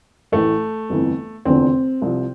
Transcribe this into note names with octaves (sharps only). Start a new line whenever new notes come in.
A1 A2 E3 A3
G1 F2 E3
F1 E2 D3 F3 C4
C2 C3 F3